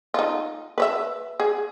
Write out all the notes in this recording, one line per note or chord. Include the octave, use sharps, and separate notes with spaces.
D#4 F4
B4 C#5 E5
G#4